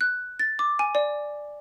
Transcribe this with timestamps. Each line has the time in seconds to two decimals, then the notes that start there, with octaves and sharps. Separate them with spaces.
0.01 F#6
0.39 A6
0.59 D6
0.79 G#5
0.95 D5